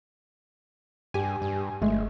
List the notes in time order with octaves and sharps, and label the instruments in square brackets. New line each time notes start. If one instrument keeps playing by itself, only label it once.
[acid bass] G2 [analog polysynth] G4 G#5
[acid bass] G2
[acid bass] G1 [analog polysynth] G#3 A3